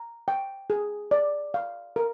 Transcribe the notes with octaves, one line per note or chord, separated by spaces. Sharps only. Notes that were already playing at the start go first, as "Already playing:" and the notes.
Already playing: A#5
G5
G#4
D5
F5
A#4